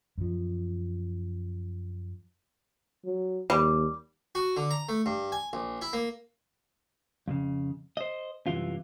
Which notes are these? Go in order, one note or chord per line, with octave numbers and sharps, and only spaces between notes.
F#2 F3
F#3
D#2 G3
F#4
D3
A#5
A3
G2
G#5
A#1
E4
A#3
F2 A#2 C#3
C5 D#5
C2 F#2 C3 E3 F4